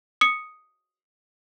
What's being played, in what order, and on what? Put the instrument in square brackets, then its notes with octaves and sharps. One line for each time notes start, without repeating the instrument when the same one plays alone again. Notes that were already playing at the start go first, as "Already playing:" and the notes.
[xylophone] D#6 C#7